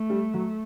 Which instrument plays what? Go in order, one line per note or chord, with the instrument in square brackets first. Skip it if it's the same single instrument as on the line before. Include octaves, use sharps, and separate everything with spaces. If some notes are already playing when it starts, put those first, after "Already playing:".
Already playing: [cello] A3
[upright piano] G3
F#3